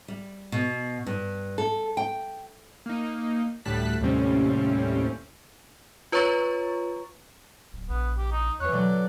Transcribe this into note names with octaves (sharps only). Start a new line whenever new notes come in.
G3
B2
G2
A4
G5
A#3 D#4
D2 A2 G3 A5 F#6 B6
D#2 A2 C3 G3 C4 C#4
F4 B4 C#5 A#5 C#6 A6
D1
A#1 B3
G4
D#4
E2 E3 C#5 F#6
B2 D3 F#3 D5